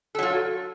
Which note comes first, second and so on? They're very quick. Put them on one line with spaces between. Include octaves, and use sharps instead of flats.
A4 F#3 F4